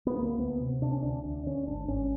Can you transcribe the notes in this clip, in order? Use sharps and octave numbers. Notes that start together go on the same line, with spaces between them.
B3
D2 A#3
D2 B3
C3
C3 D4
C#4
D2 D4
D2
D3 C#4
G#1 D4
G#1 C#4